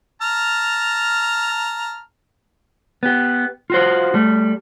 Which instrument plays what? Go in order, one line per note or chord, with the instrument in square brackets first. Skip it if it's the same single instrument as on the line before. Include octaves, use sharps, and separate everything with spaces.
[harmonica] A5 A#5 F6
[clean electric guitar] B3 G4
F4 F#4 C5
G3 A3